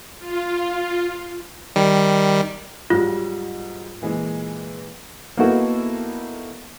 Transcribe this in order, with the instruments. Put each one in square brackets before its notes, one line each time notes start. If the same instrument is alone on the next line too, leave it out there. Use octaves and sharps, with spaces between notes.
[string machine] F4
[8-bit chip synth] D#3 G3
[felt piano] G#2 F#3 G3 [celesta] F4
[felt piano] A#2 E3 G#3
[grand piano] A#3 B3 D#4 E4 F#4 A4